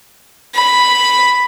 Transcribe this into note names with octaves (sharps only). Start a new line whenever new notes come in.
B5